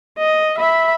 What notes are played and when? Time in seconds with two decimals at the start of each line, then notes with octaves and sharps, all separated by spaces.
0.19 D#5
0.58 E5 B5